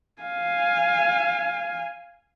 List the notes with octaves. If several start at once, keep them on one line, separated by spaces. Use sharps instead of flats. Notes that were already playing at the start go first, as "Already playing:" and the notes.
F5 G#5